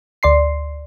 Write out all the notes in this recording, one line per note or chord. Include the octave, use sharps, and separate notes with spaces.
D2 D5 C6 C7